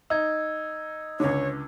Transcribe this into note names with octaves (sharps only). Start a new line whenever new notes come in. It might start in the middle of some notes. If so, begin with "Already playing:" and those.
D#4 E6 G#6
C#2 D3 C#5